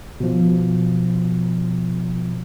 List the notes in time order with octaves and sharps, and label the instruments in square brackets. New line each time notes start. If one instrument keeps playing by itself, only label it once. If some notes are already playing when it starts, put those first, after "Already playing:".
[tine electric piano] B2 F3